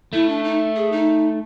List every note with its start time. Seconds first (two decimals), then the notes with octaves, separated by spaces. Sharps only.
0.13 A3 E4
0.29 D4
0.44 D#4
0.76 G#4
0.92 D#4